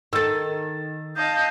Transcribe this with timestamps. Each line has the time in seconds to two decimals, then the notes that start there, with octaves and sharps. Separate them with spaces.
0.13 D#3 A4 E6 A6
1.16 D#5 F5 A5 G6